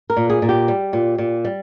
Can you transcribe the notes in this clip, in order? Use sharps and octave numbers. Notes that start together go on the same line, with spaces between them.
A#4
A#2
G#4
A#2
G4
G3
A#2
A#2
G3